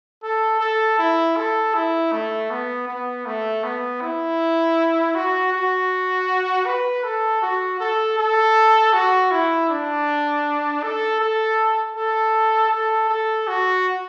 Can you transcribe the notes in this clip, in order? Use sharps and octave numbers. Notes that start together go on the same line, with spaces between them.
A4
A4
E4
A4
E4
A3
B3
B3
A3
B3
E4
F#4
F#4
B4
A4
F#4
A4
A4
F#4
E4
D4
A4
A4
A4
A4
A4
F#4